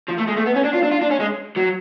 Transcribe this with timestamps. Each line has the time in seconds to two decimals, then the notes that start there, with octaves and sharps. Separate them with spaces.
0.08 F3
0.18 A3
0.27 G#3
0.36 A3
0.46 B3
0.55 C#4
0.64 D4
0.73 F4
0.83 D4
0.91 F4
1.01 D4
1.11 C#4
1.20 G#3
1.57 F#3